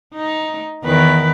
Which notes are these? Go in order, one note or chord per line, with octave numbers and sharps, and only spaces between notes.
D#4
E2 D#3 B4